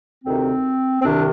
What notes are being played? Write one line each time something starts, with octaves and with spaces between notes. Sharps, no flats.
D2 C3 D#3 C4
C4
C2 C3 D#3 D4